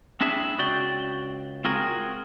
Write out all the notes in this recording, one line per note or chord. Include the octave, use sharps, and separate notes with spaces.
C4 D4 E4 G#4 E5
C#2 F#4 D5 G5
C4 F4 F#4 G#4 A#4